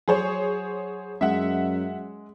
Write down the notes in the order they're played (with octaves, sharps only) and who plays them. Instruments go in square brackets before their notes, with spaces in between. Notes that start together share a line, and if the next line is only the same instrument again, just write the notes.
[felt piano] F#3 [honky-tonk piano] G#4 C5 C#5
[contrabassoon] F#2 [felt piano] G#3 [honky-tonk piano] E5 F#5